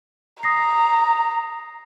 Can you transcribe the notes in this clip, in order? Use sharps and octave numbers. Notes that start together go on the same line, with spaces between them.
A#5 D#6 A#6 C7